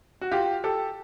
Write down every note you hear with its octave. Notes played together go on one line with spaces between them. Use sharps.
F#4
F4 G4
G4 A4